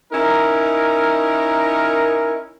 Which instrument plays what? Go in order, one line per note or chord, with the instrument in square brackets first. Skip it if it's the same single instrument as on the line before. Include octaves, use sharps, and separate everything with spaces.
[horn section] C#4 D#4 E4 A#4